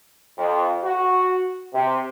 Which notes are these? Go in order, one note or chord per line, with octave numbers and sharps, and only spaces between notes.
F2
F#4
C3